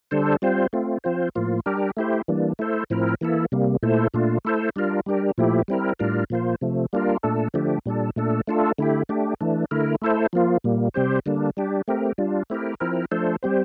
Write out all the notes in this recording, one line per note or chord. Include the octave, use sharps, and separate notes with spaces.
D3 G3 D4 A4 C5
G3 C4 F4 C5
A3 C4 F4
F3 C4 F4 C5
A2 F3 A#3 F4
G3 D4 G4 A#4
A3 E4 G4 C5
E3 G3 A#3 D4
A3 E4 A4 C5
A2 F3 C4 E4 A#4
E3 A#3 E4 A4
C3 G3 A#3
A#2 A3 E4 A4 C5
A#2 A3 D4 F4
A3 E4 A4 C5
G3 D4 F4 A#4
G3 D4 G4 A#4
A#2 F3 A3 E4 G4
G3 C4 E4 A#4
A2 G3 D4 F4 A#4
A#2 F3 A#3 F4 C5
C3 F3 A3
G3 A#3 D4 F4 A#4
A#2 A3 D4 A4
D3 F3 A3 D4 G4
A#2 G3 D4 A4
A#2 A3 D4 A4
A3 D4 F4 A4
D3 A3 E4 G4
A3 D4 G4
E3 A3 D4
D3 A3 E4 A#4
A3 E4 A4 C5
F3 A#3 F4
A#2 G3 A#3
C3 G3 C4 G4 C5
D3 G3 A#3 D4
G3 D4 G4
A3 C4 G4 A#4
G3 D4 F4
A3 C4 E4 G4 A#4
F3 C4 E4 A#4
F3 A3 D4 A4 C5
G3 C4 G4 C5